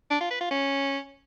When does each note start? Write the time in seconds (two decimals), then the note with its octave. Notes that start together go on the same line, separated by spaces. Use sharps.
0.10 D4
0.20 F4
0.31 B4
0.41 F4
0.51 C#4